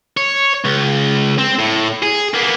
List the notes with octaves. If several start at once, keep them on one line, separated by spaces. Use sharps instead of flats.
C#5
C#2
C4
A2
G#4
A#3 B3